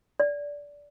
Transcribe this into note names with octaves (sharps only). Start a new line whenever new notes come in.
D5